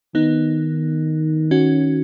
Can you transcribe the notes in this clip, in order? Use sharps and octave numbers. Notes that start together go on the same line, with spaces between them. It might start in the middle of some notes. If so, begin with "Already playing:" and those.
D#3 B3 D#4
C#4 F#4